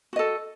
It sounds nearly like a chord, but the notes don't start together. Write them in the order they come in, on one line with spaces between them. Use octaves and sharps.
F#4 D#5 A4